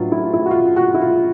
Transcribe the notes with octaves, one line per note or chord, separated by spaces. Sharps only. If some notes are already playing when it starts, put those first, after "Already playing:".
Already playing: A2 F#3 B3 D4 F4
E4
F4
E4
F#4
F4
F#4
E4
F4